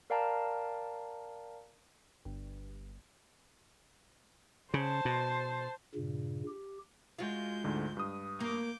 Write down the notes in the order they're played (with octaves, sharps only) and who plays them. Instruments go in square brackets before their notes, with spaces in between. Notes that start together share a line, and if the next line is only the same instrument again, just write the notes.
[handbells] A#4 D5 F5 G5 A5 A#5
[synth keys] G1
[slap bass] C#3 [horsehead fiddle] C5 A5
[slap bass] B2
[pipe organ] G2 A#2 C#3
G4
[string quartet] G#3 G6 [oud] F4 F#4
[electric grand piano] D2 G#2 D3
G2 D#6
[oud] A#3 [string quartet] D6 G6